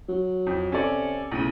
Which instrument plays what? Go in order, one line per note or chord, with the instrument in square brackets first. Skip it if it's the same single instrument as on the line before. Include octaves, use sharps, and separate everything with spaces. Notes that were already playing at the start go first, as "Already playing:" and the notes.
[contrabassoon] F#3
[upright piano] F2
[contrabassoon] C3 [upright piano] C#4 A4 D5
[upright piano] B1 C#3 D#7 [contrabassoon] A2